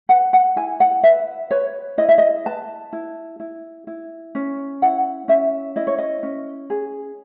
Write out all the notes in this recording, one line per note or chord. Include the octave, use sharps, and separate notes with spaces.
B4 F#5
F#5
E4 G#5
F#5
B4 E5
B4 C#5
E4 D#5
E5
D#5
B4 A5
E4
E4
E4
C#4
E4 F#5
C#4 E5
E4 D#5
C#5
D#5
C#4
G#4